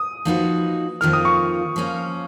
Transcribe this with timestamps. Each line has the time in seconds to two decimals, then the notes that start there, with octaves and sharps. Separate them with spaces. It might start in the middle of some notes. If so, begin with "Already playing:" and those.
Already playing: D#6
0.25 F3 A#3 D#4 F#4 B4
1.01 F2 D#3 A#3 F4 A#4 F6
1.13 D#6
1.25 C#6
1.76 F3 A#3 C#4